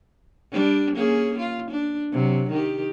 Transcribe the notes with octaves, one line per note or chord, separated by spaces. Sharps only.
G3 D4
A#3 C#4 G#4
F4
D4
C3 F#3
D#3 G4